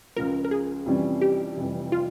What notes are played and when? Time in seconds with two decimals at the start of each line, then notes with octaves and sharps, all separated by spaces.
0.16 C#2 C#3 F3 A#4
0.45 A#4
0.51 G#4
0.86 F2 C3 E3 G3 C#4
1.21 G4
1.57 F1 F2 E3 G3
1.92 F4